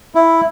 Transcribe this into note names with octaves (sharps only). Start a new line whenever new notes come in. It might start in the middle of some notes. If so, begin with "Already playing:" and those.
E4